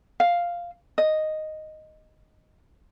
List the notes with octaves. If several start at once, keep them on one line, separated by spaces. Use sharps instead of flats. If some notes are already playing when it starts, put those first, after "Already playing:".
F5
D#5